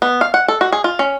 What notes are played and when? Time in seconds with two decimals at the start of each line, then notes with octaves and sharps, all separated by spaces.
0.02 B3
0.21 F5
0.34 F#5
0.48 A4
0.61 F#4
0.72 G#4
0.84 F4
0.99 C#4